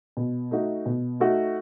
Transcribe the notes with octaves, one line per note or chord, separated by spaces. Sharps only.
B2
A3 D#4 F#4
B2
A3 D#4 F#4